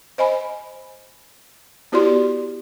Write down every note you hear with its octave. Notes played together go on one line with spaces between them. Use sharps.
C5 D#5 G#5 B5
B3 E4 F#4 G4 D5 C6